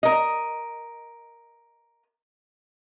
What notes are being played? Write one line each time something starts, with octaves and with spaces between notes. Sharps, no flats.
A#4 D#5